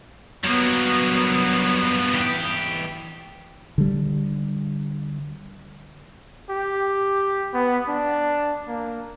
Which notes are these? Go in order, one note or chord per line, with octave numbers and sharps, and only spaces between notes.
G2 F#3 A#3 B3
E3 G4
D3 G3
G4
B3
D4
A#3